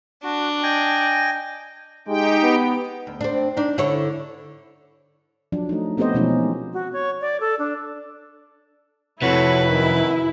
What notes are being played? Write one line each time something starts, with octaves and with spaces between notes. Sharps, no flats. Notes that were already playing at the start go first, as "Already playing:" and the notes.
D4 F#4
D#5 G5 G#5
G#3 D#4 G4 G5
B3
D2
C4 D4
D4 D#4
D3 E4 C#5
F3 F#3 D4
A3 D#4
A3 B3 C4 G4 C5 D#5
B2 E3 F3 G#3 C#4 D#4
F#4
C#5
D5
A4
D4
F2 C3 E4 F#4 A4 B4 C#5
F#2 D#3 E4